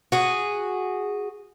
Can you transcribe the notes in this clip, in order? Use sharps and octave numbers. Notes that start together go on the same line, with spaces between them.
F#4 G#4